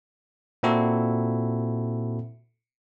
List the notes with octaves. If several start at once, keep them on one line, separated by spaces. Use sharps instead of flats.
A#2 C4 E4 F#4 A4